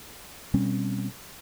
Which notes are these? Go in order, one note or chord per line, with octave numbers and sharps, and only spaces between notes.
B2 G3 C4 C#4